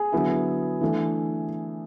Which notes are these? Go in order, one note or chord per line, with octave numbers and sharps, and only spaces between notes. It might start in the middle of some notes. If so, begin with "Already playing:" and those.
Already playing: G#4
D3 F#3 B3 E4
E3 A3 D4